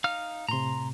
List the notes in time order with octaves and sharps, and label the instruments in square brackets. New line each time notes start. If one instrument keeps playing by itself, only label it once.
[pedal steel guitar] D#4 F5 F6
[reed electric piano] A2 C3 [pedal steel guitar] A#5 C6